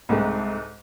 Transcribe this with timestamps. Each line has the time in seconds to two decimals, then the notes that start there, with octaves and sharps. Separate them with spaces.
0.09 C2 G#2 G#3 A3